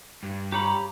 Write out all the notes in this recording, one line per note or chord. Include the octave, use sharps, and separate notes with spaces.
G2
G4 C#5 A#5 B5